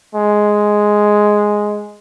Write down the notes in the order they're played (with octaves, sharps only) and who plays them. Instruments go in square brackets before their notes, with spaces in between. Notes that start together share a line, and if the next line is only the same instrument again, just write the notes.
[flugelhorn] G#3